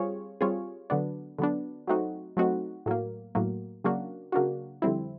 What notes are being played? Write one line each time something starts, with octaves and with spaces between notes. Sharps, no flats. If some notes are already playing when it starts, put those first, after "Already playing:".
Already playing: G3 C4 F4 G#4 C#5
G3 C4 F4 G#4 C#5
D3 F#3 B3 D4
D3 F#3 B3 D4
F#3 A3 C4 D#4 F#4
F#3 A3 C4 D#4 F#4
A2 F#3 A#3
A2 F#3 A#3
C#3 F#3 A#3 D4 F#4
C#3 F#3 A#3 D4 F#4
F2 D3 G3 C4 E4